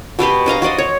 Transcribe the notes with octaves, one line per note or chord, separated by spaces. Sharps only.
B2 B3 G4 B4
D4 D#5 F5 A#5
F#4 C5 D5 D#5
C#5